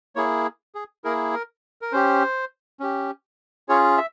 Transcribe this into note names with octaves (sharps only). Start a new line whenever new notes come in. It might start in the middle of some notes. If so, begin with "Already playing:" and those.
A#3 E4 G#4 C#5
G#4
A#3 E4 G#4 A#4
A#4
A#4
C#4 G4 C5
C#4 G4
C#4 F4 G#4 C#5
E5